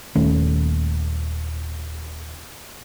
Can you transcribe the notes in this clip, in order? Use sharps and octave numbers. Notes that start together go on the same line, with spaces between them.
D#1 D#3 A3 C#4